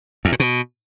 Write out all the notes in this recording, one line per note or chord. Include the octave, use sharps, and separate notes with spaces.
E2
A#2
B2